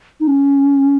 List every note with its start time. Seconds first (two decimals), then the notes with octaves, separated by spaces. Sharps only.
0.20 D#4
0.27 C#4